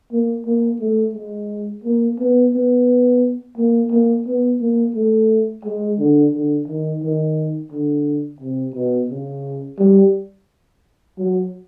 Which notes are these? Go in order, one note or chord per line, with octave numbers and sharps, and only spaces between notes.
A#3
A#3
A3
G#3
A#3
B3
B3
A#3
A#3
B3
A#3
A3
G#3
D3
D3
D#3
D#3
D3
C3
B2
C#3
G3
F#3